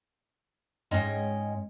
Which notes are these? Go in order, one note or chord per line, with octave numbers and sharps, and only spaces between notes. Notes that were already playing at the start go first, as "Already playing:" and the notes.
G#2 G#3 C#4 C#5 D#5 G5